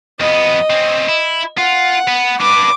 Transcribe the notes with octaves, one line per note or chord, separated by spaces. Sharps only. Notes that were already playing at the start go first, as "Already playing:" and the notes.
F2 B3 D#5
C4 C#4
E4
F4 F#5
B3
D4 B4 D6